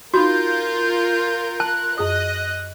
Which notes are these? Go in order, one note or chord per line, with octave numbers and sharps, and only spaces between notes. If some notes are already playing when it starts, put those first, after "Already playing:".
D#4 F4 F#4 A#4 B5 C6 G6
A5 F#6
F#2 G#4 D#5 D#6